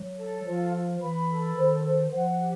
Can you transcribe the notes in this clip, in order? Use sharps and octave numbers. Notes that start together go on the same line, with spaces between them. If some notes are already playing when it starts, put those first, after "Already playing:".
Already playing: F#3
A4
F3 F4
F4
E3 B5
A4
D#3 C5
C5
F3 F#5
G4